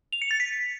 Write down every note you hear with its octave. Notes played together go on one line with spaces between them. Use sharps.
F7
C#7
A6
B6